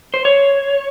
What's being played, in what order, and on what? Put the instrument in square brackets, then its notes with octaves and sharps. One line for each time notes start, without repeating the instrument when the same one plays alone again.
[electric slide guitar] C5
C#5